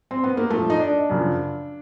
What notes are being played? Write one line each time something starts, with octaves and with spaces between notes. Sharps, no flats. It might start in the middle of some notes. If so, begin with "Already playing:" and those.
C4
B3
A#3
A#2 F3 A3
D#4
D4
F#2 C#3 F3